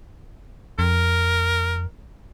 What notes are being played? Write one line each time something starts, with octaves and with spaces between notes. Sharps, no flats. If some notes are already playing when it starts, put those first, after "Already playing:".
F2 A#4